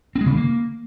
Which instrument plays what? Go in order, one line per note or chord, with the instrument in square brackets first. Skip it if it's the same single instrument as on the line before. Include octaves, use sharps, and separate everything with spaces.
[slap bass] C4
G#3
C#3
D#3
A#3